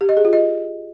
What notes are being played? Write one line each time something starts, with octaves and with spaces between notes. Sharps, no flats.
G4
D#5
G#4
F4
D#5